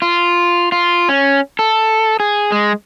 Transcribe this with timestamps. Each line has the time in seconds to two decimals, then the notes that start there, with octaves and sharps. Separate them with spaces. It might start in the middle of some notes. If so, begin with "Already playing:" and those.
0.02 F4
0.72 F4
1.09 C#4
1.59 A4
2.20 G#4
2.52 G#3